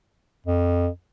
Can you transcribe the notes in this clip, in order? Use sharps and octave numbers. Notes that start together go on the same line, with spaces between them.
F2